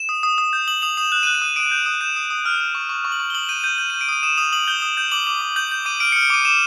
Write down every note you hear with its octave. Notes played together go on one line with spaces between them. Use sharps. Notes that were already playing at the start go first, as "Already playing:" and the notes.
Already playing: E7
D#6
D#6
D#6
G6
D#6 F#7
D#6 F7
D#6 E7
F#6 E7
D#7
F#6
D#7
D#6
D#6 D7
G6
D#6
G6 E7
D#6
D#6
F6
F6
C#6
C#6
C#6
F#7
C#6
G7
D#6 F#7
G6 D#7
G6 D#7
G6 D#7
G6 D#7
D7
D#6 D#7
D#6 E7
D#6 F7
D#6 F#7
G6 G7
D#6
G6
D6 F#7
D6
D6
G6 F#7
G6
D6 D#7
F6 D7
F6 C#7
D7
D6 D#7
D6 E7